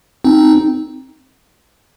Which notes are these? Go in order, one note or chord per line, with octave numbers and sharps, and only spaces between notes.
C4 D#4